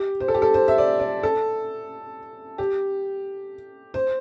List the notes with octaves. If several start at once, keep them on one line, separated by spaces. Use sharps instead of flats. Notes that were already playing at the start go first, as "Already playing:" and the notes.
Already playing: G4
C5
A4
G4
A4
C5
E5
D5
D5
A4
G4
C5